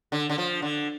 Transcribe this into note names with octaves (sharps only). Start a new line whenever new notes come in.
D3
D3
F3
D3